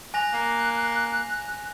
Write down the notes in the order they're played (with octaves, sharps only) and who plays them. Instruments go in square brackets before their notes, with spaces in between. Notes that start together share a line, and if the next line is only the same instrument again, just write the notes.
[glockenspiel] G#5 A#6 F7 [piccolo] F#6
[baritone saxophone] A#3